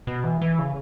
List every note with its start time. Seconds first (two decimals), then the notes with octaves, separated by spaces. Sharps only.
0.07 B2
0.24 E3
0.41 E3
0.59 C#3